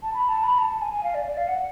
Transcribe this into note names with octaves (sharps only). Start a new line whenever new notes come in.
A5
B5
A5
B5
A5
A5
G#5
G#5
F5
D5
D5
F5
F#5